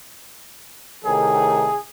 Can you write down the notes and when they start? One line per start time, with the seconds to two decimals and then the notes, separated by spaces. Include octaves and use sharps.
1.05 A2 C3 D#3 G#4